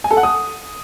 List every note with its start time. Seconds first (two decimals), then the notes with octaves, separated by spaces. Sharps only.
0.04 G#5
0.11 A4
0.17 F#5
0.23 D#6